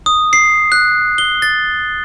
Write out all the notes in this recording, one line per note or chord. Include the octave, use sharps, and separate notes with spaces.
D#6
C7
F#6
G7
A6